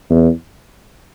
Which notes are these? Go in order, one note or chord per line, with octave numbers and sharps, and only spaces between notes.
E2